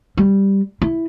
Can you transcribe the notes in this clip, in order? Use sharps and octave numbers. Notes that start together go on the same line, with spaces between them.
G3
E4